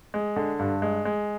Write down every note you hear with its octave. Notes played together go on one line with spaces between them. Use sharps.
G#3
D3
G2
G#3
G#3